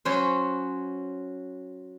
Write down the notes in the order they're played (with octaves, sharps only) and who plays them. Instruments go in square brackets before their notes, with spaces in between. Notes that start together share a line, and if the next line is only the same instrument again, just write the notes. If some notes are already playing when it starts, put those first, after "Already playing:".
[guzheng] F#3 C#4 C5